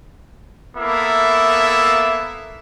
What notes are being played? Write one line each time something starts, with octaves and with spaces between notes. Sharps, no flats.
A#3 B3 E4 A4 E5